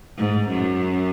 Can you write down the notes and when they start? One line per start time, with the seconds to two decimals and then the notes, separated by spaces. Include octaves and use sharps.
0.18 G#2
0.50 F#2